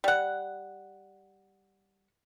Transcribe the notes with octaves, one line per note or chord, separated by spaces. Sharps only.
G3 F#5